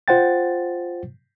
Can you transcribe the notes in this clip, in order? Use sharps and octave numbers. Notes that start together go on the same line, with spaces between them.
F4 C5 F#5 G5 A6